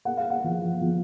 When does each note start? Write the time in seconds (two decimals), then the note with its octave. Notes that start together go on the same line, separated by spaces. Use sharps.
0.05 A#3 F#5
0.17 F5
0.30 F#5
0.44 F3
0.81 F3